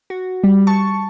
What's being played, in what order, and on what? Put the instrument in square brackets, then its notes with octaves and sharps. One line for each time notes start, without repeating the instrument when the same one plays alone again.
[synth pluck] F#4
G3
A5 C#6